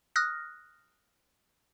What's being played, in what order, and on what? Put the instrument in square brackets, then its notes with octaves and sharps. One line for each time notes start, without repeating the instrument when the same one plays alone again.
[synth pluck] D#6 F6 F#6 A#6